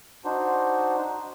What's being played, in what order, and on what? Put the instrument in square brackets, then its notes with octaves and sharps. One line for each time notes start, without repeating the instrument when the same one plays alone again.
[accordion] D4 D#4 F#4 C5